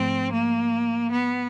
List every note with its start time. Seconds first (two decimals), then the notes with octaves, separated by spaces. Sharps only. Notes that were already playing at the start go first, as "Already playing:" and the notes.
Already playing: G#2 F3 A3 C4
0.31 A#3
1.11 B3